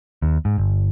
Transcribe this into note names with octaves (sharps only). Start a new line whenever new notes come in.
D#2
G#2
G1